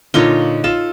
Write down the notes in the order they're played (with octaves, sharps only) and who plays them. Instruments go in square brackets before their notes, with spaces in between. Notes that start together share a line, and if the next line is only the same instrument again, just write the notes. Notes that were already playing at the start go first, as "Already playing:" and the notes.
[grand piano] A#2 D3 G7 [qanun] D#4 F4 C#5
[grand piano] F4 E7 [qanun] A4